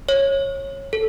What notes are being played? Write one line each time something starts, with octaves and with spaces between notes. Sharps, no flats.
C#5
A4